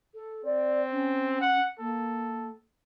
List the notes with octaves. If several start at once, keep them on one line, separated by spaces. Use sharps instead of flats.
A4
C4 D5
C#4
F#5
A#3 A4